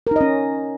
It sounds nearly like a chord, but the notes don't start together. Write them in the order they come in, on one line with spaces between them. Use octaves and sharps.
A#4 D#4 D#5 C#4